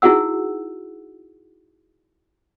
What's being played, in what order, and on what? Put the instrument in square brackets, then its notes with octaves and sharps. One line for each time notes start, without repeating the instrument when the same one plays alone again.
[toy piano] D#4 E4 F#4 G#4 F#5 E6